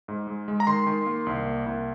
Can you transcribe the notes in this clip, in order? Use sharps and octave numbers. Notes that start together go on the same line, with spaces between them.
G#2
G#3
G#3
A#5
D#3 C6
D#3
A#3
C2
A#3
C2